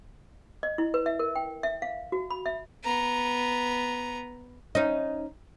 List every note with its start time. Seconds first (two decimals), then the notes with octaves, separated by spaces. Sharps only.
0.63 D#5
0.78 E4
0.94 B4
1.06 E5
1.19 A#4
1.35 G5
1.63 E5
1.82 F5
2.12 F#4
2.31 B5
2.46 E5
2.84 B3 A#5
4.75 C#4 D#4